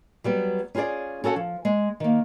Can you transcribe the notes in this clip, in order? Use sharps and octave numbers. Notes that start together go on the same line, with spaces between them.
F#3 G3 B3
C#4 F4 F#4 G#4 D5
C#4 F#4 A4 F#5
F3
G#3
D#3 A#3